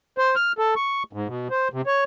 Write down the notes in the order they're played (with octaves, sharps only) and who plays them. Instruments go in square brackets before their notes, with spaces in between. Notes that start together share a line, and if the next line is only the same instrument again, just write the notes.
[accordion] C5
F6
A4
C#6
G#2
B2
C5
C3
C#5